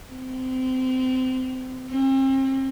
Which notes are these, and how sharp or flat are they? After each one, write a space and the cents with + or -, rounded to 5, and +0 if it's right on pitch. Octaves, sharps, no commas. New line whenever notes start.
C4 -25
C4 +40